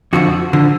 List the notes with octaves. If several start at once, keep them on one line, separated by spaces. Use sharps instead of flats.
F2 D3 F3 F#4
D3 F3